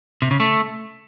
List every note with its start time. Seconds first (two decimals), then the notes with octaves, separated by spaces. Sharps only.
0.22 C3
0.31 C#3
0.40 A3